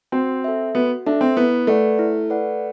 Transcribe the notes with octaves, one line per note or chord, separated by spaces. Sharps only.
C4 F#4
A4 E5
B3 F#4
D4 A4 E5
C4
B3 E4
A3 B4 D5 F#5
E4
B4 D5 F#5